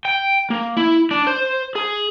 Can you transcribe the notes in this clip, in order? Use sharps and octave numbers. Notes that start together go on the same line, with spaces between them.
G5
A#3
E4
D4
C5
G#4